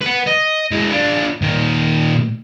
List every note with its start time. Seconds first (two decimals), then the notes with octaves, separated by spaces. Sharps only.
0.01 B4 F#5
0.27 D#5
0.72 E3 G#3
0.91 D4 F4
1.42 A#2 D#3